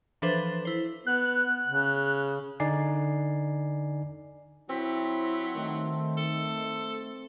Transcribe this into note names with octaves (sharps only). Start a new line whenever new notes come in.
E3 F3 D4 A4 B4 C5
E4 C5
B3 F#6
C#3
D3 D#4 D5 G#5 C7
F#3 C4 E4 B6
D#3 A3
A4